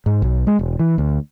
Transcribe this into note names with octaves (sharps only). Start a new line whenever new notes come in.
G#2
B1
G#3
E1
E3
D2